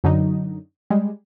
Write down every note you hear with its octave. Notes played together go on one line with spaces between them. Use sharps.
F#2 D3 F#3 D#4
G3 G#3